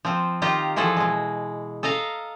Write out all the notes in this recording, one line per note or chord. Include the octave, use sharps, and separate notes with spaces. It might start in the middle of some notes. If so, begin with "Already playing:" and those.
F3 C4
D#3 F4 G4 A#5
E3 F3 F#4 G#4 A4
B2 G#3
A4 D#5 F5 A#5